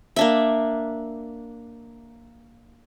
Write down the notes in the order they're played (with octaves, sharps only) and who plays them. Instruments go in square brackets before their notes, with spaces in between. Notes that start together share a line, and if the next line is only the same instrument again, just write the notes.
[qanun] A#3 D4 E5